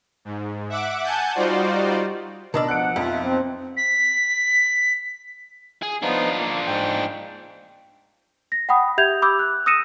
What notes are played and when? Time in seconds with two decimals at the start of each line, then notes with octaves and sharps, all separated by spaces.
0.25 G#2
0.70 E5 F#5 D6
1.04 F#5 G#5 A5 G6
1.35 G3 D#4 F4 F#4 C5 D5
2.54 B2 D4 A#4 D5 D#5 E6
2.68 F3 F#5 F#6 D7
2.96 B1 F2 F4 E5
3.23 C4
3.77 B6
5.83 G#4
6.02 F3 B3 D4 D#4 F4
6.37 A#3
6.67 G#2 G5
8.52 A#6
8.69 F#5 G5 B5 D#6
8.98 G4 E5 G6 G#6 F7
9.22 B5 D6 E6 G6
9.39 F#6
9.66 D#6 E6 A#6 C#7 D#7 E7